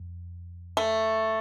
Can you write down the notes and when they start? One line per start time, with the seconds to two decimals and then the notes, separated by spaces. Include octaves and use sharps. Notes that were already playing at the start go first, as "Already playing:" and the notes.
Already playing: F2
0.77 A3